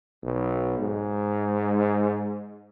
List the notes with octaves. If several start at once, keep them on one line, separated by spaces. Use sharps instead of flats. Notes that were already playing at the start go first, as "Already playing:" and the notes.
B1
G#2